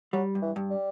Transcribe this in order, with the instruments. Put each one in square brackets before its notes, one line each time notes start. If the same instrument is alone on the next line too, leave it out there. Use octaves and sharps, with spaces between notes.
[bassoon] F#3 [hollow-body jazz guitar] G3
[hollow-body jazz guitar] G2
[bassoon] E3
[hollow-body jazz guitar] G2
[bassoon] G3